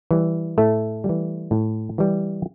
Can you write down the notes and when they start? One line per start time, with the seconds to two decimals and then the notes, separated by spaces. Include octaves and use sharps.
0.11 E3 G3
0.58 A2 A3
1.04 G3
1.09 E3
1.51 A2
1.98 E3 G3